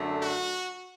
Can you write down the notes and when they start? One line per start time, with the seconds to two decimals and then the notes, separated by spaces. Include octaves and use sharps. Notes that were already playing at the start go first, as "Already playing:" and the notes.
Already playing: F#2 D3 A3 D4
0.20 F#4